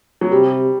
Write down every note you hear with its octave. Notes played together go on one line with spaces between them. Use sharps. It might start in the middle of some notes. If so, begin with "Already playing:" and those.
F#3
C3 G3